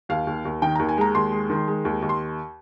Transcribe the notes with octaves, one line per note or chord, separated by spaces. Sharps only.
D#2 F5
D#2
D#2
D#3 G5
D#2 A#5
G#5
G#3 A#5
D#2 C6
G#3
D#3
G#3
D#2
D#2
C6